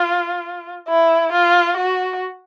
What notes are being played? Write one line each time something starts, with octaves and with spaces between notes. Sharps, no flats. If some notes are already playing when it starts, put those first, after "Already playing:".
Already playing: F4
E4
F4
F#4